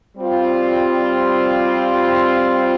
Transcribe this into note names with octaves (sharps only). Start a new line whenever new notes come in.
G3 C4 F4